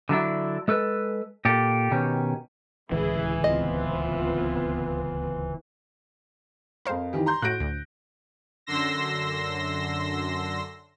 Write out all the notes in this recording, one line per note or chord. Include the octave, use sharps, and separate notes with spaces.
D3 F#3 D4 E4
G#3 A4 B4
A#2 G4 A4
B2 D#3 C#4 G4
D1 C#2 C#3 E3 E4 G#4
B3 C4 F4 D#5
F2 A#4 C5 F5
D#3 E3 G4
A#5 C6 G6
A2 F#4 F#6 A#6 D7
D2
F#2 D3 C6 E6 A#6